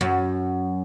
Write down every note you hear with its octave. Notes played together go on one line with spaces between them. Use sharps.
F#2